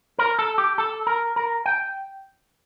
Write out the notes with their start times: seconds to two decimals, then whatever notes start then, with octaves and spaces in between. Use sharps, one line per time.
0.19 A#4
0.39 A4
0.58 G4
0.78 A4
1.07 A#4
1.36 A#4
1.66 G5